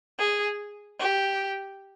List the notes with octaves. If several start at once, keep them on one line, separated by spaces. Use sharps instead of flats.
G#4
G4